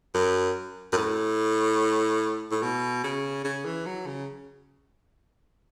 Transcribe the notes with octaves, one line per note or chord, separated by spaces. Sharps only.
F#2
F#2
A2
A2
B2
C#3
C#3
E3
F#3
C#3